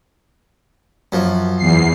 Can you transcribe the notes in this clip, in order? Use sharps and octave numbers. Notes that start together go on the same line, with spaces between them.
F#2 F3
E2 C7